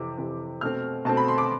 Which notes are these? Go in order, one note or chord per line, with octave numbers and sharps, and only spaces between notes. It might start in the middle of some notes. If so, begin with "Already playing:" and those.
Already playing: F2 C3 E3 D6
F2 C3 E3
B2 A3 C4 F6
B2 A3 C4 A5
B5
C6
D6